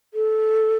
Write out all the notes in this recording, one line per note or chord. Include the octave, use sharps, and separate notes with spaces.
A4